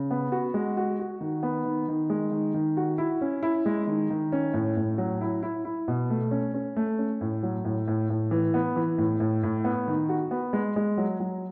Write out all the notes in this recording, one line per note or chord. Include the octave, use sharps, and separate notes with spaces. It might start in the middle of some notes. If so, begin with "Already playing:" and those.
Already playing: C#3
B3
F#4
G#3
F#4
F#4
D#3
B3
D#3
D#3
G#3
D#3
D#3
F#4
E4
C#4
E4
G#3
D#3
D#3
C#4
A2
A2
F#3
E4
E4
E4
B2
A3
C#4
C#4
A3
C#4
A2
F#3
A2
A2
A2
E3
B3
E3
A2
A2
A2
B3
D#3
F#4
B3
G#3
G#3
F#3
F#3